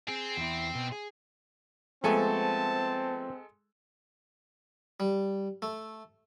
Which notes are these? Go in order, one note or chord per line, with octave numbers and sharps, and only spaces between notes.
C4 G#4
E2 E4
B2
G#4
F3 G#3 A3 B3 C4 A4 G#5 A5
G3
A3